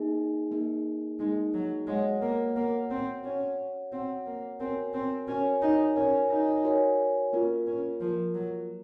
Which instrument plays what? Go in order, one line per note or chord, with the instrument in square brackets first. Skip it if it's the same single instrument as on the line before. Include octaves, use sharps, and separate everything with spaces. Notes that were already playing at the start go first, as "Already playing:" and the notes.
Already playing: [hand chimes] A#3 D#4 G#4
A#3 D#4 G#4
[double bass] G#3 [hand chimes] A#3 D#4 G#4
[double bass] F#3
[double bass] G#3 [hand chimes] F#4 C#5 F#5
[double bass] A#3
[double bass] A#3 [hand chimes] F#4 C#5 F#5
[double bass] C4
[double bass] C#4 [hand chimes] F#4 C#5 F#5
[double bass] C4 [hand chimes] F#4 C#5 F#5
[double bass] A#3
[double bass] C4 [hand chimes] F#4 A#4 C#5 G#5
[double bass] C4
[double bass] C#4 [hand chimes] F#4 A#4 C#5 G#5
[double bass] D#4
[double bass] C#4 [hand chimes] F#4 A#4 C#5 G#5
[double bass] D#4
[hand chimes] F#4 A#4 C#5 G#5
[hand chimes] A#3 F4 A#4 [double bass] C#4
[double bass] C#4
[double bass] F3 [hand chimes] A#3 F4 A#4
[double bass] F#3